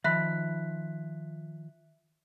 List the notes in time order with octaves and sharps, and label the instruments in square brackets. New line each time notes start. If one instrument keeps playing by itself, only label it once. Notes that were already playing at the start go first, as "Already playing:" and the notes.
[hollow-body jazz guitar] D#3 F3 B5 [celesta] E5 F#6 B6